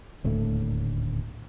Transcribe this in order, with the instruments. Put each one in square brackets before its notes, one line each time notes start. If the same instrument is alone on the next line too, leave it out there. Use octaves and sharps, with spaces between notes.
[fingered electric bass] D#1 D2 A2 A3